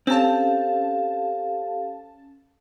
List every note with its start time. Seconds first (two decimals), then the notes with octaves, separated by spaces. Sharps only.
0.07 C4 C#4 G4 A4 F5 A5